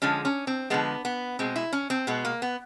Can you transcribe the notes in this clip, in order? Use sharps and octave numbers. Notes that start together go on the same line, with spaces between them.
D3 F3 G#3 C#4
C#4
C4
D3 F3 G#3 B3
B3
B2 G#3 C4
E4
C#4
C4
B2 G#3 B3
A#3
B3